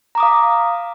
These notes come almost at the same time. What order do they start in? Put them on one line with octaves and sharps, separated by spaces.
A#5 D6 D#6 F5